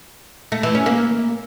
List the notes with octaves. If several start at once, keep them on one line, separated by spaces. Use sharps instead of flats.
A3
E3
C#4
A#3